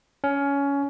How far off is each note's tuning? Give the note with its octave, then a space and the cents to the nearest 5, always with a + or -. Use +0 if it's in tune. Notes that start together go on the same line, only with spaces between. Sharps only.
C#4 +20